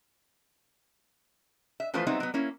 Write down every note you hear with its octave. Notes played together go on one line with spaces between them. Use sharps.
E5
E3 F3 A3 F4 B4 C5
F#3 G3 B3 C4 D#4 E5
F#3 B3
A#3 C#4 E4